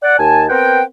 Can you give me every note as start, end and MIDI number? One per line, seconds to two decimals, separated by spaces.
0.03 0.16 74
0.03 0.16 78
0.18 0.44 39
0.18 0.44 80
0.18 0.44 81
0.50 0.81 59
0.50 0.81 60
0.50 0.81 70
0.50 0.81 72
0.50 0.81 78
0.50 0.81 79